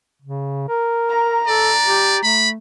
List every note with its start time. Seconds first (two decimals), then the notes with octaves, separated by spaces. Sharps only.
0.22 C#3
0.69 A#4
1.09 A#5
1.47 A4 D5
1.86 G4
2.24 A3 B5